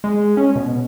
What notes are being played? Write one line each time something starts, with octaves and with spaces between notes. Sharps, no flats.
G#3
C#4
B2